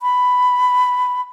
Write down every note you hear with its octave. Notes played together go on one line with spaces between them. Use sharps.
B5